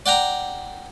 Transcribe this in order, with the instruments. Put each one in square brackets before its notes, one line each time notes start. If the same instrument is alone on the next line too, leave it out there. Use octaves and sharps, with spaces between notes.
[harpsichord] D5 F#5 G5 A#5